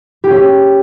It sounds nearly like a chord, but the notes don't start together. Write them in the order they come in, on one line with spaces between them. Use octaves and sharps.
G4 G#4 C#4